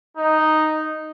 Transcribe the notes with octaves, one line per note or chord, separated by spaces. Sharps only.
D#4